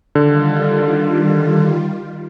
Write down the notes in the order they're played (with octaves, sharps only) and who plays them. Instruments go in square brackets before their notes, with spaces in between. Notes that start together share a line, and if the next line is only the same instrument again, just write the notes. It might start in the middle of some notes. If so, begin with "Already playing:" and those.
[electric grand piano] D3 [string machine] D#3 G3 F4